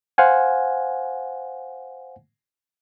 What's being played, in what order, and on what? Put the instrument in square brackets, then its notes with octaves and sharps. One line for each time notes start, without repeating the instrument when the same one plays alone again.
[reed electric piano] C5 F5 F#5 G#5